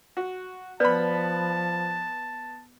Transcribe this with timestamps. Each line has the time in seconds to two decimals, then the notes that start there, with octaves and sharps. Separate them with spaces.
0.17 F#4
0.80 F3 B3 B4 D5 A5 B5